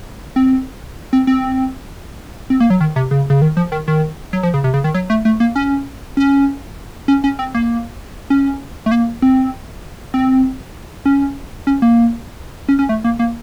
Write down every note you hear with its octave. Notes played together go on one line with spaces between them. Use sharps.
C4
C4
C4
C4
A#3
F#3
D#3
C3
C#3
C#3
D#3
F3
D#3
D#3
F#3
F3
C#3
C3
C#3
D#3
F#3
A3
A3
A#3
C#4
C#4
C#4
C#4
C4
A#3
C#4
A3
A#3
C4
C4
C#4
C#4
A#3
C#4
C#4
A3
A#3
A#3